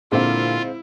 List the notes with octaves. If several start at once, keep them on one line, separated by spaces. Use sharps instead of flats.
A#2 D3 G#3 C4 E4 F4 F5